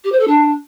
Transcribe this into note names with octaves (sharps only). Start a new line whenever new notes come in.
G4
C5
A4
D4